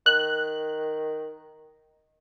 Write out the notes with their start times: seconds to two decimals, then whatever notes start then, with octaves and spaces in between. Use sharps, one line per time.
0.06 D#3 F#6